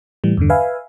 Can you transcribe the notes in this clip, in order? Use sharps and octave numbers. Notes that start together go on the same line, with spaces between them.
A2 E3 G3
E2 G2 D3
B4 E5 F5 G#5